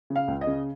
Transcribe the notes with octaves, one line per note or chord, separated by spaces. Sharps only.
C#3
F5
C#2
D#5
C#3